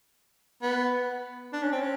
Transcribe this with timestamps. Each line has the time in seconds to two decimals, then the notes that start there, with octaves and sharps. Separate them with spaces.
0.63 B3
1.53 D4
1.63 C#4
1.72 C4
1.81 C#4